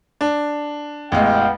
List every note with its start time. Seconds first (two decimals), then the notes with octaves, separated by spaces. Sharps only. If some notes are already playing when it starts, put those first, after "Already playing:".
0.21 D4
1.12 A1 E2 G#3 B3 F5 G5